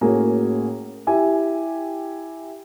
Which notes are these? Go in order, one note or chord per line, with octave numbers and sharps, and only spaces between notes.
A2 A#3 C#4 F#4 G#4
E4 G4 G#5